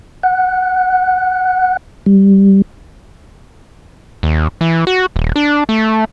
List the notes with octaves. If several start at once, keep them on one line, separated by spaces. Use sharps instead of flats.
F#5
G3
D#2
E3
F#4
D#1
D4
A3